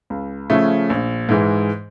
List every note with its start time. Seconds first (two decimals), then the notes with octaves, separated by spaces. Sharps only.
0.10 C#2
0.50 C#3 F3 A3 C#4
0.90 A#1
1.29 G#2 E3 G#3